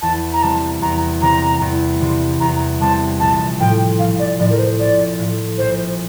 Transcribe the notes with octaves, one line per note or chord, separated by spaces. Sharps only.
E2 A5
A#5
C3 G3 C4 A5
E2 A#5
C3 G3 C4 A#5
E2
C3 G3 C4
E2 A#5
C3 G3 C4 A5
A#1 A5
A2 F3 G5
A#1 F5
D5
A2 F3 D5
A#4
C5
A#1 D5
A2 F3
A#1 C5